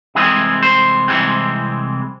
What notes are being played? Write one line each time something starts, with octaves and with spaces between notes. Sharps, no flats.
C2 C3 E3 G#3 C4 G#4
C5
C2 C3 E3 G#3 C4